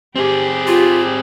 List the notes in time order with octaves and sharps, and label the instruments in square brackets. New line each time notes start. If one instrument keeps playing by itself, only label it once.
[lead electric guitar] C4 G#4 [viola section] G4
[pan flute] F4